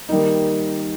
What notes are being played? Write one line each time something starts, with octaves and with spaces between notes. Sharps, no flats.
D#3 G3 A#3 D#4